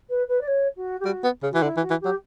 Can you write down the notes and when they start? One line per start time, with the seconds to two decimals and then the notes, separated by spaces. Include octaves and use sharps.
0.09 B4
0.28 B4
0.41 D5
0.47 C#5
0.76 F#4
1.00 G4
1.05 G3 F#4
1.24 B3
1.43 C#3
1.51 E3 F#4
1.62 D3 E4
1.77 E3
1.81 F#4
1.91 E3
2.01 F#3 G4